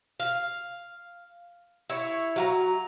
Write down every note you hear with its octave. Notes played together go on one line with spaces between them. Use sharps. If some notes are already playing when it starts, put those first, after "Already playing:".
F5
E4 C#5
F#3 F5 A#5